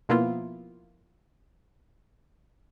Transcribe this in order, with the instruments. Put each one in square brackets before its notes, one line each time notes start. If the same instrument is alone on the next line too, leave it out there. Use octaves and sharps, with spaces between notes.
[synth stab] B2 F3 A#3 B3 E4 F4